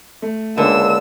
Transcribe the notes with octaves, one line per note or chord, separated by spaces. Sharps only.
A3
C#2 D3 A#3 E6